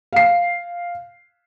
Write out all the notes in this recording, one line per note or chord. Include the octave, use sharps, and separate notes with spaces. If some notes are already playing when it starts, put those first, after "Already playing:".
F5 C7